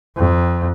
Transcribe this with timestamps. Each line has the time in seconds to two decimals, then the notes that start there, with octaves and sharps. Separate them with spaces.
0.17 F2